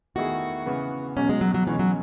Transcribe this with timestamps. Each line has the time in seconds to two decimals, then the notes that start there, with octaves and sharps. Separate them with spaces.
0.15 E2 D#3 A3 E4 F#4 G#4
0.66 C#3 E3 B3
1.16 E1 E2 B2 F#3 C#4
1.29 G#3
1.41 F#3
1.54 F#3
1.67 B2 E3 G#3 C#4
1.79 F#3